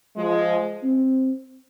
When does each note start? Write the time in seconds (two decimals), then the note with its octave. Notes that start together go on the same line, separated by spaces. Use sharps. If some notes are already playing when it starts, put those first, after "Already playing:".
0.16 F3 G#3
0.83 C4